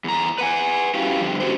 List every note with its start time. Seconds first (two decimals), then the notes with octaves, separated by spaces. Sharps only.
0.04 E2 A#5
0.38 B4 F#5 G#5
0.95 C#4 E4 F#4 G4 F5 G5
1.21 G2 D3 F3
1.40 C#4 F#4 G4 C5